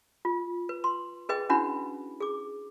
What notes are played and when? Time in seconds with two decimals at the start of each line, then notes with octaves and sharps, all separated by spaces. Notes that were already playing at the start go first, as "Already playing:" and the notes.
0.25 F4
0.69 B4
0.84 C6
1.29 G#4 B4 D#5 G5
1.49 C#4 D4 E4 F#4 F#5 B5
2.20 G#4 D6